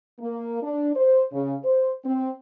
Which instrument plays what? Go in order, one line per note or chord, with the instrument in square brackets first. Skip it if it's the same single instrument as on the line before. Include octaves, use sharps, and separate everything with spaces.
[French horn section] A#3
D4
C5
C#3
C5
C4